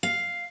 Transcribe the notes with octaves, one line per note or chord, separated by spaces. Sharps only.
F5